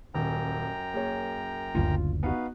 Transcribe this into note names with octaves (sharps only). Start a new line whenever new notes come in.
D#1 F#2 G5 A#5
A#3 G#4 C#5
F#1 D2 F4
B3 D#4 F#4 B4 F5